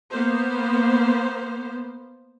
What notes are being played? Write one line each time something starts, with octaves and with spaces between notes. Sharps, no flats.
A#3 B3 C5